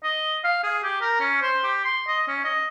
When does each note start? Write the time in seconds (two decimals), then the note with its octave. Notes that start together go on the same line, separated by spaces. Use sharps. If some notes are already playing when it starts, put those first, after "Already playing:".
0.03 D#5
0.44 F5
0.63 G#4
0.83 G4
1.01 A#4
1.20 C#4
1.42 C5
1.64 G4
1.84 C6
2.08 D#5
2.28 C#4
2.44 D#5